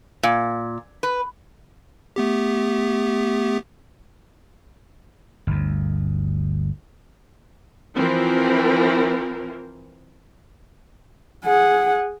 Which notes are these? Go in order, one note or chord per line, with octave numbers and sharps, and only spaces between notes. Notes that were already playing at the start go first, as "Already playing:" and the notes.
A#2
B4
A3 B3 G4
G1 D2
E3 F3 C4 A#4
G#4 F#5